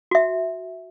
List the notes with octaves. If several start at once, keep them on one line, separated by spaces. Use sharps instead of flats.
F#4 E5